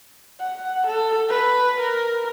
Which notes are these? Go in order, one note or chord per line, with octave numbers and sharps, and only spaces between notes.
F#5
A4
B4
A#4